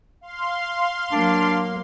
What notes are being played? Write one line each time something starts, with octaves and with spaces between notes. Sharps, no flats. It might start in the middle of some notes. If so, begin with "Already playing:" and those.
F5 C6
F#3 A#3 D4